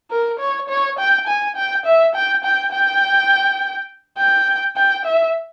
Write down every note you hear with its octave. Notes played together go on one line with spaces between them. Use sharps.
A#4
C#5
C#5
G5
G#5
G5
E5
G5
G5
G5
G5
G5
E5